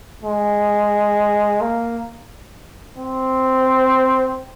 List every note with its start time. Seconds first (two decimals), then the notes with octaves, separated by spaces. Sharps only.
0.23 G#3
1.61 A#3
2.98 C4